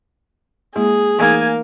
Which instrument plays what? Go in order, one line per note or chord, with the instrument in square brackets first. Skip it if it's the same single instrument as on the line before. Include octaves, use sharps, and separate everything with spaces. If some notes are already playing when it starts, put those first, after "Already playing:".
[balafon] G#3 A#3 E4 [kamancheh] G#4
[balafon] E3 A3 D#4 [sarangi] A#3 [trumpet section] G#5